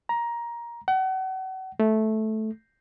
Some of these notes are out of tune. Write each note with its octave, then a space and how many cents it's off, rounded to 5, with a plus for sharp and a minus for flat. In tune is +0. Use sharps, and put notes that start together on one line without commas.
A#5 +15
F#5 +35
A3 -10